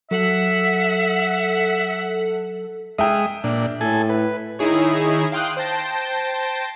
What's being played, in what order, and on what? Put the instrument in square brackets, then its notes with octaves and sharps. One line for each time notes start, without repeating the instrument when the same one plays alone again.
[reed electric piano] F#3 [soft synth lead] A4 [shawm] E5 [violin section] F#5
[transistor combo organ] G#3 D#6 [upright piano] E5 G5
[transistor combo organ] A#2 D4
[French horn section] A2 [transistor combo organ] A4 G#5
[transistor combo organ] B4
[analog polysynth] D#3 D#4 E4 G#4 C#5
F5 G5 C6 D#6 F#6
C5 G5 A5 A#6